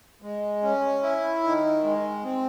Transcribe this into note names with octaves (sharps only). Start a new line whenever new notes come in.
G#3
C#4
E4
D#3
G#3
C4